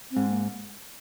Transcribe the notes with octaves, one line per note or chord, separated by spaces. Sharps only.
C4
G#2
A#3